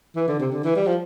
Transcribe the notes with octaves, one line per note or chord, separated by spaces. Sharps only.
E3
D3
C3
D3
E3
G3
F3